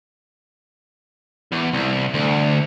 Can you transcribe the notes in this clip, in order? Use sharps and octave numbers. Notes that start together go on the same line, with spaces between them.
E2
C2
D2